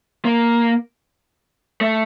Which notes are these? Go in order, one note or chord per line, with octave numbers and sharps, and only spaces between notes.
A#3
A3